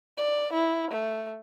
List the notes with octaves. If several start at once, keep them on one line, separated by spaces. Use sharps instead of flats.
D5
E4
A3